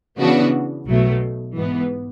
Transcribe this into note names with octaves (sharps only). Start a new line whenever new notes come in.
C#3 E3 B3 D4 F#4
B1 B2 F#3 A3
G#2 E3 B3